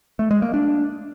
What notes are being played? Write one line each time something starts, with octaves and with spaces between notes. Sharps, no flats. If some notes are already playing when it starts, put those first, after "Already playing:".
A3
G#3
A#3
D4